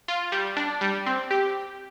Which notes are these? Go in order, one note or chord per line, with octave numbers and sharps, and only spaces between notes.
F4
G3
D4
G3
C4
G4